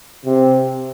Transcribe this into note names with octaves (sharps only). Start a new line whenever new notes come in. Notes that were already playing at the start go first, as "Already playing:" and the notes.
C3